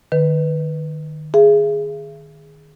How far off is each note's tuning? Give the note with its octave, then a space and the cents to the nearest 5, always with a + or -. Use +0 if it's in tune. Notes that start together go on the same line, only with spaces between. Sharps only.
D#3 -25 B4 +0
G#4 +0 E5 +35